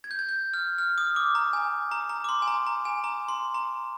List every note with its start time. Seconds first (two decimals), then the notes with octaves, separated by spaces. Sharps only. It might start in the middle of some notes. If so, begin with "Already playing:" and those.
0.04 G#6
0.11 G6
0.19 G#6
0.29 G6
0.54 F6
0.78 F6
0.98 D#6
1.16 D6
1.35 A#5
1.53 G#5
1.91 A#5
2.09 A#5
2.24 D6
2.29 C6
2.42 G#5
2.48 A#5
2.67 A#5
2.85 G#5
3.04 A#5
3.28 C6
3.54 A#5